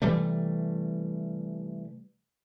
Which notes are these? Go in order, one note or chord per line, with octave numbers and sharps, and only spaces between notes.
C3 E3 G3 A3